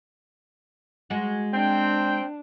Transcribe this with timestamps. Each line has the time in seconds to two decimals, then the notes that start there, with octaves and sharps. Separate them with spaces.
1.10 G#3 F#4
1.54 C4 D4 G5